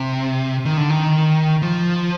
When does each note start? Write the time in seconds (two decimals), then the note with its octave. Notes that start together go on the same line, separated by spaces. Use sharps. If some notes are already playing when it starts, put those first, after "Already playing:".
Already playing: C3
0.65 D#3
0.77 D3
0.90 D#3
1.62 F3